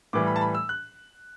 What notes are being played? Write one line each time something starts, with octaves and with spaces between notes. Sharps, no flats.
A2 E3 G3 D6
B5
A5
B5
E6
F#6